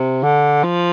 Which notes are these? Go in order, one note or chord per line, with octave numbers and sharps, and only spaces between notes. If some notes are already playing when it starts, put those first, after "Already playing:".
Already playing: C3
D3
F3